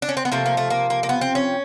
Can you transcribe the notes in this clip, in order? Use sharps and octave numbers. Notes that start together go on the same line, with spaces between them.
D4
C#4
C4
B3
C3 F3 A3 A#3
A#3
A3
A#3
A#3
A#3
B3
C4
C#4